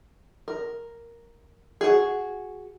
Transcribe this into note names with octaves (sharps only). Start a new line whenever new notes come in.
A#4
F#4 G#4